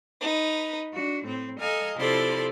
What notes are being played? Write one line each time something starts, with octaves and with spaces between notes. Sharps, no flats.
D#4 B4
D4 F#4
A2 C4
A4 D#5 F5 G#5 A#5
C3 F3 E4 A4 D5 C6